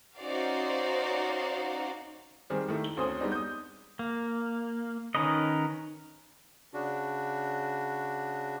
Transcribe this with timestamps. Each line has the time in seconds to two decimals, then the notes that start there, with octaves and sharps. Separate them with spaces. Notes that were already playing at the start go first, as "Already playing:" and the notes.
0.17 C#4 D#4 F#4 C5 D5 F5
2.50 D#3 G3 C4 G#4
2.68 D#3 A3 E4
2.84 G7
2.97 D2 C4 C#4 C5 D#6
3.20 G3 G#3 B3 C4 D4 D#4
3.32 D#6 G6
3.99 A#3
5.15 D#3 C#4 A#4 B4 D#5
6.73 C#3 D4 F#4